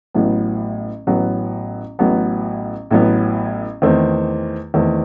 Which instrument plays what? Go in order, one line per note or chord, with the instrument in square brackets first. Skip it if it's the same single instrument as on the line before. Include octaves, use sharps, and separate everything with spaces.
[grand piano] A1 A2 F#3 B3
A1 A2 F#3 B3
A1 A2 F#3 B3
A1 A2 F#3 B3
E2 D#3 A3 C4
E2 D#3 A3 C4